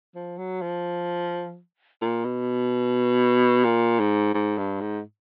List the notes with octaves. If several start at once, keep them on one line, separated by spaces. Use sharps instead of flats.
F3
F#3
F3
A#2
B2
A#2
G#2
G#2
G2
G#2